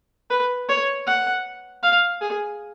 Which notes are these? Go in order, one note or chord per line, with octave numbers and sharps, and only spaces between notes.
B4
C#5
F#5
F5
G#4